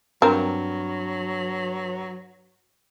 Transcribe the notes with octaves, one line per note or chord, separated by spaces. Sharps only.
G2 F#3 C4 A#4